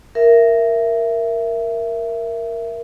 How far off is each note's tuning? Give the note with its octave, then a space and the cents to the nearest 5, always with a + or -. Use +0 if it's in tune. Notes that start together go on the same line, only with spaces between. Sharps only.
A#4 +0 E5 +15